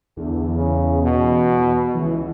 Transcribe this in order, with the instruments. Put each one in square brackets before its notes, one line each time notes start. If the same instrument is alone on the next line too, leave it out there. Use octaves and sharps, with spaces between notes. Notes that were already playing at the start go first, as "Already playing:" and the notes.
[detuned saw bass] E2 [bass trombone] D3
[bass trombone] C#3
B2
[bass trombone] C#2 [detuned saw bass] E3